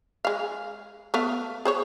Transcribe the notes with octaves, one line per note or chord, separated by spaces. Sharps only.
G#3 F5
A3 B3 F5
G#4 C5 C#5